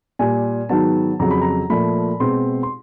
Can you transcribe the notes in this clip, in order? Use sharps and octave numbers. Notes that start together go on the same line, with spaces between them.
A#2 G3 A#3 G#5
G#2 D#3 F#3 B3 A5
F2 C#3 F#3 A#5
B5
A#5
A#2 F3 A3 B5
B2 G#3 C4 C6
C6